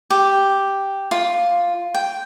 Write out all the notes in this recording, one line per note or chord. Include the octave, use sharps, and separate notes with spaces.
G4
F4
G5